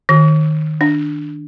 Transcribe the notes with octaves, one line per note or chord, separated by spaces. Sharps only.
D#3
D4